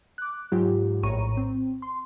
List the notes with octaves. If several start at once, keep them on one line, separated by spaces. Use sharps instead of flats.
D6 F#6
G#2 F#3 F4 G4
A#1 A2 C#5 A#5 C#6 D#7
C4
C6